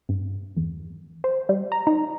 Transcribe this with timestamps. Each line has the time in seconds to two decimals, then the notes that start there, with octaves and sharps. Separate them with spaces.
0.09 G2
0.57 E2
1.24 C5
1.49 G3
1.72 A#5
1.87 D#4